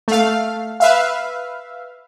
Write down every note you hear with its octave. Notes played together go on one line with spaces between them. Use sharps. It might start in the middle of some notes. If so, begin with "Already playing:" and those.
A3 F5
B4 E5 F5